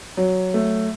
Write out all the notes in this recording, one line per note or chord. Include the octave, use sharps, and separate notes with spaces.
F#3
A3